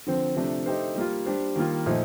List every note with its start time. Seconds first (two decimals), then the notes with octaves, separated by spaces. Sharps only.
0.07 D3 F3 C4
0.36 C3 F3 A3 D4
0.66 A3 D#4 G4 C5
0.96 G3 A#3 F4
1.26 G3 D4 G4 C5
1.56 D#3 G3 A#3 F4
1.86 A#2 F3 A3 D#4